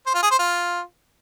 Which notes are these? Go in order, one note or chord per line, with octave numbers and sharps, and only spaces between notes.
C5
F4
G#4
C5
F4